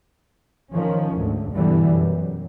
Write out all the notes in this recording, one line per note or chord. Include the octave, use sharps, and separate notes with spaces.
D#3 F3 C#4
D2 G#2
G2 B2 D3 E3 G3
F#2